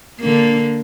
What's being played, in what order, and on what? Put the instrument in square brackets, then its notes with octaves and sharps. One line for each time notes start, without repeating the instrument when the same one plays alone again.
[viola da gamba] D3 A#3